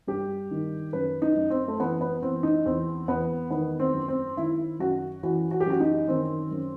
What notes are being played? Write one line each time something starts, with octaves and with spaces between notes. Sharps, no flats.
G2 G4
D#3
F#2 B4
D#4
F#2
C4
A3
E3 B3
B3
E3 C4
D#4
E2 C4
E2 B3
D#3 B3
C4
F#2
C4
D#3 E4
F#2 F#4
E3 F#4
F#4
G4
F#2 F#4
D#4
D#3 C4
F#2